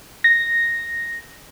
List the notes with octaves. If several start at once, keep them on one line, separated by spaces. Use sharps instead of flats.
A#6